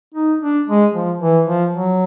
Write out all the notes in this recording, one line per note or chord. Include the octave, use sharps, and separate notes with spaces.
D#4
D4
G#3
F3
E3
F3
F#3